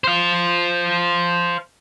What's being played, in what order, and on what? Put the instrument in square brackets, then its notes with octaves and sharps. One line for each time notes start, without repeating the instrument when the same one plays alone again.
[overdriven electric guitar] C5 F5